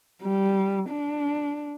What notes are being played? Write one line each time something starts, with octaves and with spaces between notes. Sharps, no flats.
G3
D4